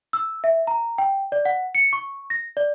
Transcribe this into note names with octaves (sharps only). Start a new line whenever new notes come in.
E6
E5
A#5
G5
D5
F#5
C#7
C#6
A#6
D5